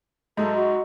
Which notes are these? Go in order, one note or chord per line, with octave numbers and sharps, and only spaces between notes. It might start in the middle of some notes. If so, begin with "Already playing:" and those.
G#2 F#3 G#3 D#4 E4 A4
F#4